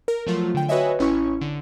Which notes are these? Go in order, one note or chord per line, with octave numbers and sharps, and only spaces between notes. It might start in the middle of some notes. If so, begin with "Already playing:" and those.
A#4
F3 F#3 A3 F4
D3 G5
F#4 B4 C#5 D#5 E5 G#5
A1 C#4 E4 C#6
D3